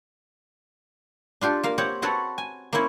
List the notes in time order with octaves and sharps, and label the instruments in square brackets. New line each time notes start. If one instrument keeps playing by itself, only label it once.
[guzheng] D4 F4 G4 A4
A#3 F5
C4 G4 C#5 F#5
C4 F#4 A4 B4 C#5
G#5
A#3 C4 C#4 E4 C#5